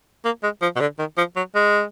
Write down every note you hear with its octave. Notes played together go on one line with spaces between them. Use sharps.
A#3
G#3
F3
B2
D3
D#3
F3
F#3
G#3